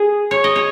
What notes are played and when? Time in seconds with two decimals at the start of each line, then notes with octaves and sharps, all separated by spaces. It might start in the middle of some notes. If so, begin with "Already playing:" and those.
Already playing: G#4
0.31 C#5
0.44 D#5
0.56 C#5